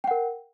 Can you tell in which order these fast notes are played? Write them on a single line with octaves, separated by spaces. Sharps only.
G5 F#5 A#4